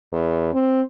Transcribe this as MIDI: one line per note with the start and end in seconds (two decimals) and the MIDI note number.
0.13 0.53 40
0.53 0.81 60